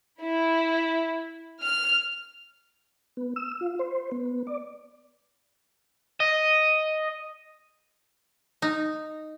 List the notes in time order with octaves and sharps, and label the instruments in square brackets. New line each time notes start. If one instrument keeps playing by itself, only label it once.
[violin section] E4
F6
[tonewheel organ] B3
E6
F4
C5
B3
D5
[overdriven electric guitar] D#5
[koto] D#4